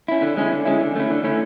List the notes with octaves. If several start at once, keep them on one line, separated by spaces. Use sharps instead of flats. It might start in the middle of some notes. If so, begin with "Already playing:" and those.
C#4 E4
D3
G#3 C#4 E4
D3
G#3 C#4 E4
D3
A3 C#4 E4
D3
A3 C#4 E4